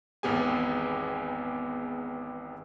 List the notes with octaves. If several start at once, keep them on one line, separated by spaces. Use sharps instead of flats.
G#1 E2 B3 G4 G#4 G#5